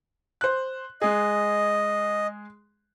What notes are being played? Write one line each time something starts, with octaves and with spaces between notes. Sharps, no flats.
C5 F#6
G#3 G#4 D#5